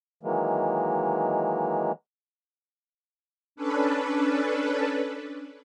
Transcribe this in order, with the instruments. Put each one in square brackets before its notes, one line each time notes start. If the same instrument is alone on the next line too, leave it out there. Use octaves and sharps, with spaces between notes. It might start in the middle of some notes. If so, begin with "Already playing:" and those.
[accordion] D#3 E3 F#3 G#3 A#3
[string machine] C#4 D4 A4 B4